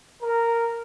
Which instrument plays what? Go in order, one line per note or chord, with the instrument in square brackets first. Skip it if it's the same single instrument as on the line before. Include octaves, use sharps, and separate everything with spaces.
[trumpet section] A#4